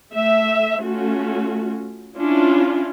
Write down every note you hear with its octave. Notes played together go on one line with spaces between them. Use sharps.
A3 E5
A3 C#4 F4 F#4
C#4 D4 E4 F4